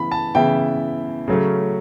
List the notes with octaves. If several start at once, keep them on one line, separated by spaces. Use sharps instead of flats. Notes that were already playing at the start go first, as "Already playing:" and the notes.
Already playing: C#3 E3 B3 E4 B5
A5
C#3 E3 B3 E4 G5
C#3 F#3 A3 C#4